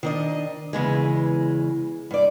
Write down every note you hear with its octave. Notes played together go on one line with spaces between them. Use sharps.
D#3 D4 D#5
E2 C#3 E3 G#3
G2 D5